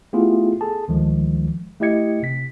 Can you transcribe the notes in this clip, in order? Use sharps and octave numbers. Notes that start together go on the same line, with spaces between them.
A3 B3 E4 F4 G4 G#4
G#4 A4 A5
D2 D#3 F3 G#3
A3 E4 G4 D#5 G#6 C#7
C3 B6